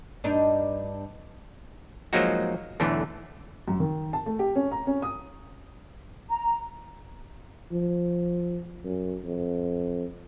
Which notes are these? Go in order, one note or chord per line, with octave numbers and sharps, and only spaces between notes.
G2 D4 D#4
F3 F#3 G#3 A#3 D#4 F#4
B1 E2 D3 E3 A3
F#2
D#3
A5
A3
G4
C#4
A#5
C#4
D#6
A#5
F3
F#2
F2